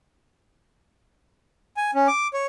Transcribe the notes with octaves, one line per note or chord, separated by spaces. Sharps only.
G#5
C#4
D6
C#5